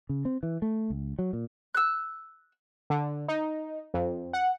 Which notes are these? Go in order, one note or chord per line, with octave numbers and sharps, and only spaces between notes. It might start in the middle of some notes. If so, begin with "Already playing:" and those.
C#3
C4
E3
A3
C#2
F#3
A#2
E6 F#6
D3
D#4
F2
F#5